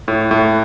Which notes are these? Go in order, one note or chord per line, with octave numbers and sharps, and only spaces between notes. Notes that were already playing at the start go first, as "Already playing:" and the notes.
A2
A2